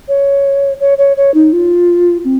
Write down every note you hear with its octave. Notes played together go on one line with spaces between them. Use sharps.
C#5
C#5
C#5
C#5
D#4
F4
C4